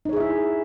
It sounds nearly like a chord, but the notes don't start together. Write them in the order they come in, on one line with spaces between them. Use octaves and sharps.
D#4 C#5 G#4 E5 E4